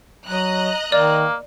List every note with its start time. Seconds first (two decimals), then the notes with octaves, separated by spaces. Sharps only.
0.24 F#3 D#5 A#5 F#6
0.92 D#3 A#3 D5